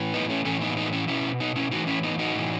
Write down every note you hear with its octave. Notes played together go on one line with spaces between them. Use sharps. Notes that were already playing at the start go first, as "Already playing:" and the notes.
Already playing: A2 E3
B3 D#4
A3 C#4
A2 E3 A3 C#4
B3 D#4
B3 D#4
C#4 E4
B2 C#4 E4
B3 D#4
C#4 E4
A2 E3 D#4 F#4
C#4 E4
B3 D#4
D#4 F#4
A2 E3